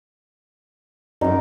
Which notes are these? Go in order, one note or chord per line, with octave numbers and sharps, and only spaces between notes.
F#2 D#4 D6